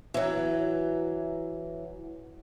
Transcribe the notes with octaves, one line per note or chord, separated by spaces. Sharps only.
E3 F#3